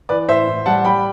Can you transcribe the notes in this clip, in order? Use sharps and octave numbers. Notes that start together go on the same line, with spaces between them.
E3 B4 D5
A2 C5 E5
A2
G3 F#5 A5
G3 G5 B5